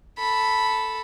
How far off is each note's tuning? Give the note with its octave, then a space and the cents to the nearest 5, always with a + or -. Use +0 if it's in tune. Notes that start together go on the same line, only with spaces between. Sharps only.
A4 +0 B5 +0